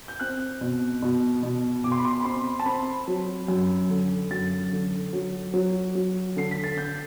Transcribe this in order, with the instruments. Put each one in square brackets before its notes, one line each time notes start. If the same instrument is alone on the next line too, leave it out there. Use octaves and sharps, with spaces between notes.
[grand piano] G6
C4 F#6
B2
B2
B2
B2 D6
C6
B5
C6
B5
C4 C6
A5
C4 B5
F#3
F#2
D3
F#2 A6
D3
F#3
F#3
F#3
D3 C7
B6
A6
D3 G6